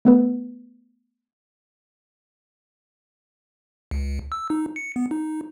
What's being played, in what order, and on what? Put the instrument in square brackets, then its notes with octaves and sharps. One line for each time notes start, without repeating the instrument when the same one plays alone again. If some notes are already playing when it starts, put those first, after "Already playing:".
[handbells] A3 B3 B4
[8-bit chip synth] C#2
E6
D#4
C#7
B3
D#4